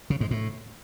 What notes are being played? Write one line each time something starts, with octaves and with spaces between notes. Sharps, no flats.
C#3
G#2
A2